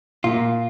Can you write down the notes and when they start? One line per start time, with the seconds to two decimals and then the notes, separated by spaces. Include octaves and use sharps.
0.24 A#2 F4